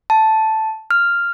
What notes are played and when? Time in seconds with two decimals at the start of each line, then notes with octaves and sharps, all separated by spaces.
0.10 A5
0.91 F6